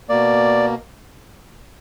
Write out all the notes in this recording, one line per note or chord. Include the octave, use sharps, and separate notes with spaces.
B2 A#3 D5